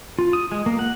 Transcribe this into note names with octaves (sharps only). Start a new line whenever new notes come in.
F4
D#6
G#3
A#3
F#5